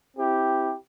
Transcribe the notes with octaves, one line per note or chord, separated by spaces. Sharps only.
C4 E4 G4